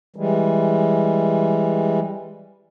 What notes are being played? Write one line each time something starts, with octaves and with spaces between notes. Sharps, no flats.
E3 G3 G#3